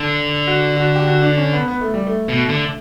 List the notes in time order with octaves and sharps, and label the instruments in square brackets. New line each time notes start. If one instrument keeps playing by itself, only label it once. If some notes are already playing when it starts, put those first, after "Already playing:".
Already playing: [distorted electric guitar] D3 [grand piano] A4
[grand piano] F#4
F#4
G4
F#4
D4
C#4
B3
B3
A3
G3
A3
[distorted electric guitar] B2
D3